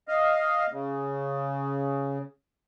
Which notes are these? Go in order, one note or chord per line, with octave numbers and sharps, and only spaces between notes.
D#5 F5
C#3